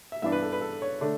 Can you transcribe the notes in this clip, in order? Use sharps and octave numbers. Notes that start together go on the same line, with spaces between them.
E5
G2 E3 B3 D4 E5
B4
A4
B4
A4
C#5
D3 A3 D4